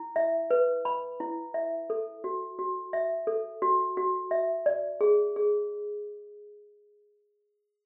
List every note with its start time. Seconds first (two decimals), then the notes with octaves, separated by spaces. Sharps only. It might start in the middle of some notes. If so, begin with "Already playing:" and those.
Already playing: E4
0.16 E5
0.51 B4
0.85 B5
1.20 E4
1.54 E5
1.90 A4
2.24 F#4
2.59 F#4
2.93 E5
3.27 A4
3.62 F#4
3.97 F#4
4.31 E5
4.66 D5
5.01 G#4
5.36 G#4